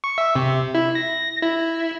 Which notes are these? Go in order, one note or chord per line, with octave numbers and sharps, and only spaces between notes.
C#6
E5
C3
E4
A#6
E4